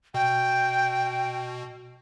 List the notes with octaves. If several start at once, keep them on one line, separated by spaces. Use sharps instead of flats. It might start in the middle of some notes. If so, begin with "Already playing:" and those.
B2 G5